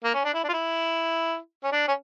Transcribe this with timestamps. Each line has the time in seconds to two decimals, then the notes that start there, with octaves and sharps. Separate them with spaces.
0.04 A#3
0.14 C#4
0.24 D4
0.34 E4
0.44 D4
0.49 F4
0.53 E4
1.63 C#4
1.72 D4
1.88 C#4